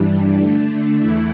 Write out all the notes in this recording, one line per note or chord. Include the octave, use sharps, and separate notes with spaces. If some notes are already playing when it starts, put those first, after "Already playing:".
Already playing: G2 E3 G3 D4
D3 A3 D4
E2 E3 A3 E4